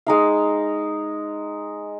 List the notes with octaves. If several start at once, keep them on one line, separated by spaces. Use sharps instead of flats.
G#3 D#4 F5